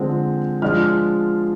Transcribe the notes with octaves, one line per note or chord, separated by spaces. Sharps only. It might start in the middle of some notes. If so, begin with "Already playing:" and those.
Already playing: D3 F3 G#3 C4
F3 G#3 D4 F4 F6